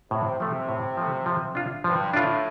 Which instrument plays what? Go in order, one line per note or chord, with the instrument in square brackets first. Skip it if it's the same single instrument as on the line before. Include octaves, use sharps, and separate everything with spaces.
[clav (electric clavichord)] A2 [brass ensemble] C3
[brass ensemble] C3 [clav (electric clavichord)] F3 A3
[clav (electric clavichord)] A2
F3 A3
F3
D4 F4
[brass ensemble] G2 [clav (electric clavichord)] F3
[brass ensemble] A2 [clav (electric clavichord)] D4 F4